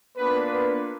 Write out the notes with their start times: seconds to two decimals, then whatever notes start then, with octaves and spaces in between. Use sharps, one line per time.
0.18 A#3 B3 D4 F4 B4
0.49 B3 B4